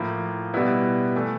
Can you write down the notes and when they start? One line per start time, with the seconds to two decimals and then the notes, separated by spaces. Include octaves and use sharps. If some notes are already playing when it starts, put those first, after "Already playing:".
Already playing: A2 F3 A#3
0.54 B2 G3 B3 E4
1.16 E3 A3